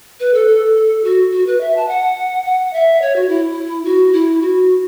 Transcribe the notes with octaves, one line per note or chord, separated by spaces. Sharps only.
B4
A4
A4
F#4
F#4
B4
E5
A5
F#5
F#5
E5
C#5
F#4
E4
F#4
E4
F#4